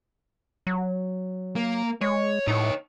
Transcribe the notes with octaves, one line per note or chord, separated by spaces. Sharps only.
F#3
A#3
G#3 C#5
A2 D#4 C#5